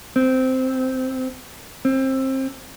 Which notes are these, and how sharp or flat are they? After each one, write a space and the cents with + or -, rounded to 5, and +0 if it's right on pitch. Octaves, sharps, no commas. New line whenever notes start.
C4 -10
C4 +25